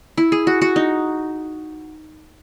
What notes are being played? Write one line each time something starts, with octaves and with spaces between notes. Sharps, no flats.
E4
G#4
F#4
F#4
D#4